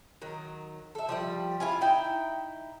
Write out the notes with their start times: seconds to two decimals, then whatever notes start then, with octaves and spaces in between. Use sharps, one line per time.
0.22 D#3 F#3
0.95 A4 E5
1.09 F3 G3 G4
1.60 E4 F4 G#5
1.81 D#4 E4 G5